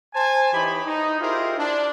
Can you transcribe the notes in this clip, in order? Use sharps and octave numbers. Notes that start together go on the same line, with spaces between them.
C5 G#5 A5
E3 D#4 G4 C#5 B5
D#4
E4 F4 G4 G#4 A#4 C5
D4